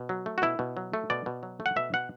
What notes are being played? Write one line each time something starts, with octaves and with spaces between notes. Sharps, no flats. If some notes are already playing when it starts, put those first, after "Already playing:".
Already playing: B2
F#3
A3
F#4
B2 E4
B2
F#3
A3
B2 D5
B2
F#3
A3
F#5
B2 E5
B2 F#5